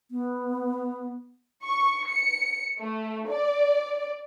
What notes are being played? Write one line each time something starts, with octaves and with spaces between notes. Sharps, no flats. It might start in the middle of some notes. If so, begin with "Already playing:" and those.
B3
C#6
C#7
A3
D5